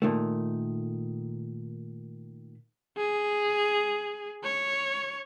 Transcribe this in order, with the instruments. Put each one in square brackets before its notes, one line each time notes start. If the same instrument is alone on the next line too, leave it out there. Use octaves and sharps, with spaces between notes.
[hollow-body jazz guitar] A#2 D#3 A3
[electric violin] G#4
C#5